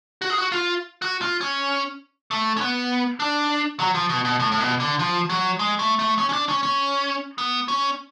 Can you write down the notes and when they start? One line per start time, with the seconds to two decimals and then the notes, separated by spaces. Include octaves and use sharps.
0.22 F#4
0.30 G#4
0.38 F#4
0.52 F4
1.02 F#4
1.22 F4
1.41 C#4
2.31 A3
2.57 C#4
2.61 B3
3.20 D4
3.80 F#3
3.95 F3
4.09 B2
4.25 B2
4.40 A2
4.52 A2
4.60 B2
4.80 D3
4.99 F3
5.30 F#3
5.59 G#3
5.79 A3
5.99 A3
6.19 C#4
6.29 C#4
6.33 D4
6.49 C#4
6.63 C#4
7.38 B3
7.68 C#4